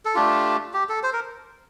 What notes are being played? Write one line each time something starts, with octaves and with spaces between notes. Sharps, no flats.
A4
A3 D4 F4 G4
G4
A4
C5
A#4